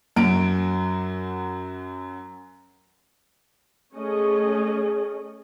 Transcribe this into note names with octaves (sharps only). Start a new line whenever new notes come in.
F#2 F#3 D7
A3 C#4 G#4 D#5